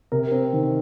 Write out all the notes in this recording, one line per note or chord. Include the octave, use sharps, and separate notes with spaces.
C3 A#4
C4
D#3